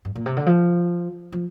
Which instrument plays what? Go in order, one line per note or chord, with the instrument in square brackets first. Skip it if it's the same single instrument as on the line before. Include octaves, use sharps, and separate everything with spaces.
[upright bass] G2
A#2
C3
D3
F3
F3